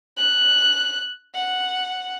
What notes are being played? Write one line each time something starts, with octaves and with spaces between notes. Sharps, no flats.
F#6
F#5